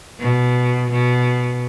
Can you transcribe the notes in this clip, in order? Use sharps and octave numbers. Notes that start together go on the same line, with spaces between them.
B2
B2